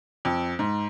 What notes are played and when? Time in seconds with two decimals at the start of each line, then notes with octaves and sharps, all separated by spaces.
0.25 F2
0.59 G#2